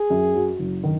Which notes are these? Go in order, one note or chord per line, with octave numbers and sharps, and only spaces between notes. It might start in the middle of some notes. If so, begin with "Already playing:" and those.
Already playing: G#4
F#2
F#3
F#1
D#3